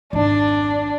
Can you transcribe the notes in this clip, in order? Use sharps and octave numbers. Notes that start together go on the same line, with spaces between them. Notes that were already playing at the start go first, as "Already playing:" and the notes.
G#1 F2 D4